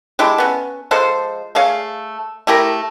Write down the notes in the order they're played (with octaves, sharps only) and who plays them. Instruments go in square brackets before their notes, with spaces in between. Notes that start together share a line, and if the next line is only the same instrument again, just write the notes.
[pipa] G#3 E4 G4 A4
B3 C#4
F3 G#3 A4 C5
A3 G#4 C#5 F5
A3 E4 G4 A#4